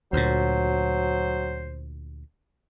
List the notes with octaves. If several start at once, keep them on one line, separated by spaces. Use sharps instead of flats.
D2 A#2 F#3 C5